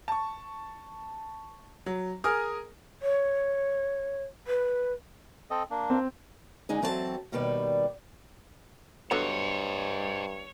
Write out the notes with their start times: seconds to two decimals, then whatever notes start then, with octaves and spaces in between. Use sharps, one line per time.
0.08 A5 C#6
1.86 F#3
2.24 G#4 A#4 G#5 D#6 F6
3.02 C#5
4.47 B4
5.50 C4 A4 D#5
5.70 A#3 D4
5.90 C4
6.69 D3 G#3 D#4 G#4
6.82 E3 F#3 C4 A4 D5 A5
7.32 D#2 B2 D#3 G3 B4 D5
9.11 G2 D3 F#3 B3 C5 C#5 D#5